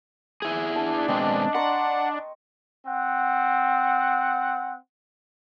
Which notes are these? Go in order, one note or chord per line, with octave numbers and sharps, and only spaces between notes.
E4 G#4
D4 A5
B2 G#3 C4 D#5 G5 C#6
F#5 A#5 C6 C#6
C4 F#5